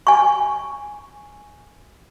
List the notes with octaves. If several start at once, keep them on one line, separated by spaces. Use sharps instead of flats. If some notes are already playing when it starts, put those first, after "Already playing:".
G#5 C#6